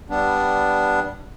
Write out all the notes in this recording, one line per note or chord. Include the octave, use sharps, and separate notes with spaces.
G3 B3 D4